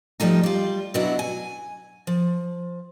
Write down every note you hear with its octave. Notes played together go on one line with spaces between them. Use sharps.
G#2 F3 G3 A3 D#4
G3 F4
B2 F#3 B3 D4 E4 F#4
G#5
F3